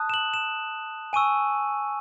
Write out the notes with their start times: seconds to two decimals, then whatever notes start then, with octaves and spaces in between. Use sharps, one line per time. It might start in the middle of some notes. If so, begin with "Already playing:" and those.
Already playing: A5 D#6 F#6
0.10 E7
0.14 F#7
0.34 E7
1.13 G#5 C#6 E6 D#7